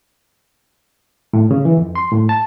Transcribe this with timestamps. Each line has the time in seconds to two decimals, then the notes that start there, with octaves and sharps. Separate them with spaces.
1.33 A2
1.51 C#3
1.65 E3
1.77 F2
1.96 C6
2.12 A2
2.29 A5